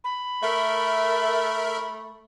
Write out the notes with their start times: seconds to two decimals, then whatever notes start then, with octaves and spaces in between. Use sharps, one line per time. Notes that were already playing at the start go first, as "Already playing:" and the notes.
0.04 B5
0.43 A3 A#4 E5